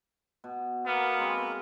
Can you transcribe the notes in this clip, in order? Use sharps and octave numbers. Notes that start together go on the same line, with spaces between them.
B2
A#3 B3 A#4
G#3 C4